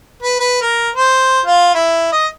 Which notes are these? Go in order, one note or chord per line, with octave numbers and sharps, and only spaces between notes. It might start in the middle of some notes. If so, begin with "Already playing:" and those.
B4
B4
A#4
C5
F4
E4
D#5